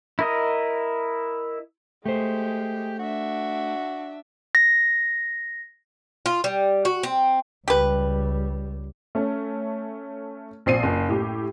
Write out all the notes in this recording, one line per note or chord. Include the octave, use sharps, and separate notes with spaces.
E4 A#4 D#5
G#3 A3 G4 C5
D4 F#4 E5
A#6
F4
G3
F#4
C4
C#2 G3 G4 B4
A3 C#4
A#1 C4 C7 D#7
F#1
A2 G4